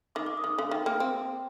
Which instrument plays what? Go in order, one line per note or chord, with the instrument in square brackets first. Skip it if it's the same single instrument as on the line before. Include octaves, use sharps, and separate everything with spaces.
[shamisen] D#3 [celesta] D6
[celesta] D6
D#6
[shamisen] D#3
[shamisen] D3 [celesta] F5
[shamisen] D#3 [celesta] G5
[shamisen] A#3 [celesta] G5
[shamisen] C4